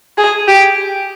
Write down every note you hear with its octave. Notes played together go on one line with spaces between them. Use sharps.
G#4
G4